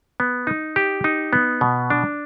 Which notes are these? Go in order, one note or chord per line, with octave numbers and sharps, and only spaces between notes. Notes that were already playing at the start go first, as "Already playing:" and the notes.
B3
D#4
G4
D#4
B3
B2
D4